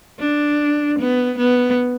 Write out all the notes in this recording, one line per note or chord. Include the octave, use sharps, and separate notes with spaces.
D4
B3
B3